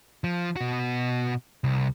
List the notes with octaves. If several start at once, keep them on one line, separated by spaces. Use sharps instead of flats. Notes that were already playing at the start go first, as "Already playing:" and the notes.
F3
B2 F#4
C2